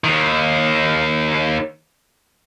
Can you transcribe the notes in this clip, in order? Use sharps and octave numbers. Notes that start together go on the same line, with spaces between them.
D#2 D#3